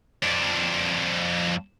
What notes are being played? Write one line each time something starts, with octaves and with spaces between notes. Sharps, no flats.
F2 D4